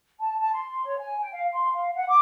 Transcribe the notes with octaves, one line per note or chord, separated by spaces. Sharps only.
A5
A5
C6
C#5
G#5
G5
F5
C6
F5
F#5
D6